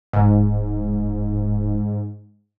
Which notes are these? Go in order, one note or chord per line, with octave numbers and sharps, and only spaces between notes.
D1 G#2